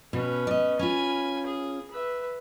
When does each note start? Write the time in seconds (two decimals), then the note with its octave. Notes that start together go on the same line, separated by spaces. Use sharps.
0.13 B2 C#4 B4
0.47 D5 D#5
0.79 C#4 F4 G#5 B5
1.47 G#4
1.91 B4 E5